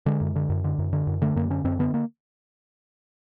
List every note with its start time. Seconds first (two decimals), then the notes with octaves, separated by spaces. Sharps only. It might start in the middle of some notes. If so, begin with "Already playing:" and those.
0.06 D3 G#3
0.21 F#2
0.36 D3
0.49 F#2
0.64 D3
0.78 F#2
0.93 D3
1.07 F#2
1.22 D3 A3
1.36 F#2 A#3
1.50 D3 C#4
1.64 F#2 C4
1.79 D3 B3
1.94 A#3